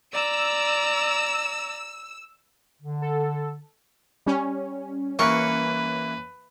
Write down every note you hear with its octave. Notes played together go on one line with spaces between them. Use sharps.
D5 A#5 E6
D3
A4
G3 C#4
E3 A#3 A#4 B4 C#6